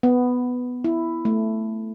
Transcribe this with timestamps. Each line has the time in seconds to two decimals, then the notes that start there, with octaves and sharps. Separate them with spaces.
0.03 B3
0.84 E4
1.25 A3